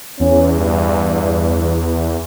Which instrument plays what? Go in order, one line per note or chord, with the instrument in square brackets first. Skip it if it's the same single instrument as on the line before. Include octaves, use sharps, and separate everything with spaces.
[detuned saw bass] E2 [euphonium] C#4
[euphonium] G2